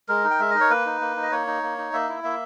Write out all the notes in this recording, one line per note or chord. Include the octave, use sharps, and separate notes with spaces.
G#3 A#4
D#4
G5
G#3 E5
D#4 D#5
C#5
A#3 B4
D#4
A#3
D#4
D#5
A#3 C#5
D#4
A#3
D#4
A#3 E5
E4
A#3 E5